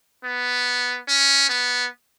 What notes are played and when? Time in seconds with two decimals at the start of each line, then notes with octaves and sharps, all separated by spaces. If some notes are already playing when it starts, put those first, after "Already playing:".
0.24 B3
1.08 C#4
1.49 B3